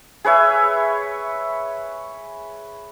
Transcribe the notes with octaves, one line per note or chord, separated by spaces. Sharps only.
G#4 B4 C#5 E5